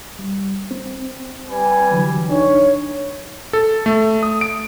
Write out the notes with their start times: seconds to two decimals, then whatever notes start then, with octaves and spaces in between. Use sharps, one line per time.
0.19 G3
0.71 C4
1.46 G3 B4 G#5
1.91 D3 E3 F#3
2.28 C2 D4 D#4 C#5
3.53 A4
3.86 A3
4.23 D#6
4.41 D7